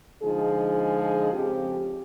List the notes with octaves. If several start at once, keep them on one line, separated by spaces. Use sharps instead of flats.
D3 F3 G#3 D#4 G#4
F2 C#3 C4 G4